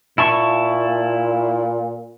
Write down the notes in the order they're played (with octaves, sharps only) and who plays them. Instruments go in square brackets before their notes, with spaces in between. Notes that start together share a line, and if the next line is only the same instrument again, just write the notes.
[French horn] A#2 [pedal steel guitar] E4 A5 C#6